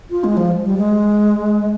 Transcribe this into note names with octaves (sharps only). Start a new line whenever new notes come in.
F4
G#3
F3
G3
G#3